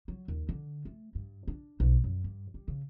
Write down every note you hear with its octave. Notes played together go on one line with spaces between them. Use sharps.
F#3
D#2
D3
A3
G2
D4
B1
F#2
G2
G3
C#3